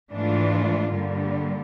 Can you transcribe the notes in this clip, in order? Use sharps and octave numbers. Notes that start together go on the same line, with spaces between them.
G#2 E3 A3 D4 F4
G2 D3 G3 A#3